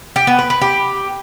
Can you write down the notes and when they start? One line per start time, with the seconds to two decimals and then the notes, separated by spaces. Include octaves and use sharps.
0.16 G4
0.27 B3
0.39 B4
0.50 B4
0.61 G4